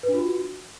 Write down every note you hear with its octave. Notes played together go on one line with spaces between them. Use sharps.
B4
D4
F4
F#4